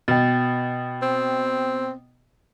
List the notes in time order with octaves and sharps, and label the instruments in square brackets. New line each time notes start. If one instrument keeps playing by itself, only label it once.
[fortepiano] B2 [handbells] G5 A6
[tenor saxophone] C4